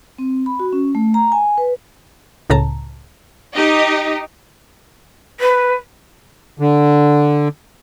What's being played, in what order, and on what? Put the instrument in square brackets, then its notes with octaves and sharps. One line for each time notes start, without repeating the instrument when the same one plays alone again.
[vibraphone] C4
B5
F#4
C#4
A3
A#5
G#5
B4
[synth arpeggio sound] C#2 A2 C#3 A5 A#5
[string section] D#4 G4 D#5
[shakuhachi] B4
[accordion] D3